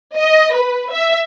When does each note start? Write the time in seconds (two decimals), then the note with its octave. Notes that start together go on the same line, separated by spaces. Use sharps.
0.16 D#5
0.54 B4
0.92 E5